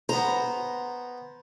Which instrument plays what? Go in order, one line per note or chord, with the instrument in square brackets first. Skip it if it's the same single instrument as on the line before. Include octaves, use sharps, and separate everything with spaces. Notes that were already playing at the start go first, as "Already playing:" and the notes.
[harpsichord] B3 C5 [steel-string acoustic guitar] A#5